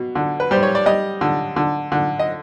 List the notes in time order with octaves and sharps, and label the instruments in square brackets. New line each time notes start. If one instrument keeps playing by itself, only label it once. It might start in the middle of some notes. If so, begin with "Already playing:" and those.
Already playing: [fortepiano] B2
D3
B4
G3 C5
C#5
D5
G3 D#5
D3
D3
D3
D#5